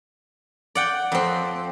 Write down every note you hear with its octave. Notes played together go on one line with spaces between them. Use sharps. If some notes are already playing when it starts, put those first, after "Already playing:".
D5 F#5 G5
F2 C4